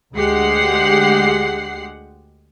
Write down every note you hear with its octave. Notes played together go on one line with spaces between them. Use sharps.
D2 G#3 G4 F#5 C7